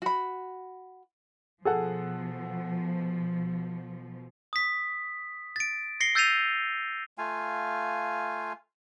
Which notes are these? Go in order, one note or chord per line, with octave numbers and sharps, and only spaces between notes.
F#4 B5
B2 F3 G#4 A4 F#5
D#6 B6
A6 D7
A#6 C7 C#7 G7
E6 G6 A6 C7 D#7 F7
A3 F4 F5 G#5